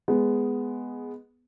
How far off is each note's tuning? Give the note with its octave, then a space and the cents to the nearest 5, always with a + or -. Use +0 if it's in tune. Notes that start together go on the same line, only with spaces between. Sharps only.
G#3 +0 B3 +5